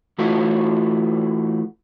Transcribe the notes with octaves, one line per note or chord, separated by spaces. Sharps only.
E3 A3 F4 F#4